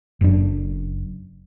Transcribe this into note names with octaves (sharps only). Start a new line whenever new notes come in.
F#1 F#2 C4 D4